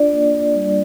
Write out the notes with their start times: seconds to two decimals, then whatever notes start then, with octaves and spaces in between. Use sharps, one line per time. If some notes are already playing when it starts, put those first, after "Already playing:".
Already playing: D4 F4 D5
0.12 A#3
0.33 D4
0.55 G3